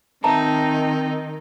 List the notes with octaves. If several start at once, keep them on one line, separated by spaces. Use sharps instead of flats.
D#3 C4 D#4 E5 A5 A#5